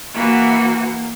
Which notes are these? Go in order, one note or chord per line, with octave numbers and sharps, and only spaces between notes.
E3 A#3 F#4